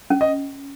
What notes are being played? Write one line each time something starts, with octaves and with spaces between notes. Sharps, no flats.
C#4
D#5